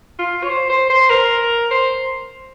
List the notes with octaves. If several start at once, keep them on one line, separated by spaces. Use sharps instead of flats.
F4
C#5
C5
C5
C5
A#4
C5